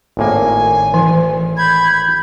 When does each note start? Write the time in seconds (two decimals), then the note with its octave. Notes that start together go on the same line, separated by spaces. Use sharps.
0.17 G#1 A2 A#3 G#5
0.94 E3
1.57 B5 G6 G#6